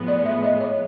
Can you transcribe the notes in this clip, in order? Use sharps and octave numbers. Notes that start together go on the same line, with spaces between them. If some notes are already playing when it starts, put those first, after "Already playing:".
Already playing: A2 F3 G#3 B3
D5
E5
D#5
C#5